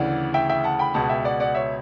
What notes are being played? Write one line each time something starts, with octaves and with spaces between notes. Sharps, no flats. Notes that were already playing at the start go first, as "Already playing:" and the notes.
Already playing: D2 C#3 E3 D5 F#5
E5 G5
E5 G5
F#5 A5
G5 B5
C#2 B2 F#5 A5
E5 G5
D5 F#5
D5 F#5
C#5 E5